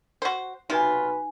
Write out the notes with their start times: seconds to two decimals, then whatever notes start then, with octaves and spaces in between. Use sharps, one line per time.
0.22 F#4 C5
0.70 B1 C3 D#4 F4 F#4 B4 G#5